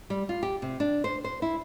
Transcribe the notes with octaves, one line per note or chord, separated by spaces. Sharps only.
G3
F4
G4
C3
D4
C5
C5
E4